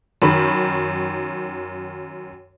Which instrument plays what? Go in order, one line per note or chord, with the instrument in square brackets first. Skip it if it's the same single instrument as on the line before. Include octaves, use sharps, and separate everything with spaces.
[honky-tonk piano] F#2 D#3 B5